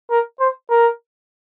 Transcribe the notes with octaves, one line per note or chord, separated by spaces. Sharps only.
A#4
C5
A#4